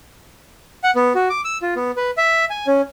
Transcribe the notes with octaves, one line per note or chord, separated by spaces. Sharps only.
F#5
B3
F#4
D6
E6
F4
B3
B4
E5
G#5
C#4